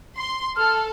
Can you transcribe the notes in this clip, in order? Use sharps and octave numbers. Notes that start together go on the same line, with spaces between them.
C6
A4 F6